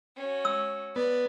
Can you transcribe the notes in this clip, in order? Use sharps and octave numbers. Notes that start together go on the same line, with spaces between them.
C#4 F#4
E6
B3 D5